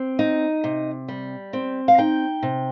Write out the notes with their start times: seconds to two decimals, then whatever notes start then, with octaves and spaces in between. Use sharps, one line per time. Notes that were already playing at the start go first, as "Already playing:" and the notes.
Already playing: C4
0.19 D#4
0.64 C3
1.08 G3
1.53 C4
1.88 F5
1.98 D#4 G5
2.43 C3